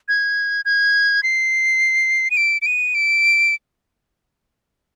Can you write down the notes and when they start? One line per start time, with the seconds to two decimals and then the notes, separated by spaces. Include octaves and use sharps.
0.08 G#6
0.65 G#6
1.23 C7
2.31 D#7
2.37 D7
2.62 D7
2.66 D#7
2.95 D7